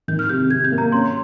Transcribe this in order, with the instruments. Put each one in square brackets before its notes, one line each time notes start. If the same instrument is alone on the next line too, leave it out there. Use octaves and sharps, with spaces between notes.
[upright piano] D#3 [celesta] G6
[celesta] F6
[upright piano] C3 [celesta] G6
[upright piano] C3 [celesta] G#6
[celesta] G6
[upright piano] A#3
[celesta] A#5
[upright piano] C#4 [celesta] C6